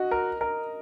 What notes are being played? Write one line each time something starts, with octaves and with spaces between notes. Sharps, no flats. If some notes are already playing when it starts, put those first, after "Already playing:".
Already playing: F#4 D#5
A#4
A#4